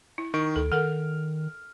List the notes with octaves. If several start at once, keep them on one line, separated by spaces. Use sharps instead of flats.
E4
D#3 C#6 D7
D2 A4
D#3 A4 A#4 F#5 F6